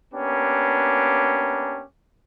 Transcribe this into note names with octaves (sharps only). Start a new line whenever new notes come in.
A#3 B3 C#4 D4 G4